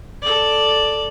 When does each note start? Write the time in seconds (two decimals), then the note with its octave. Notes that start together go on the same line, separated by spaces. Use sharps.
0.22 A4 D5